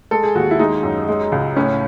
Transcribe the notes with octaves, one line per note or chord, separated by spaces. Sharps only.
G#3 A4
G#4
D#2 F#4
E4
G#3 D#4
F#2
G#3
C#2
A2 C#4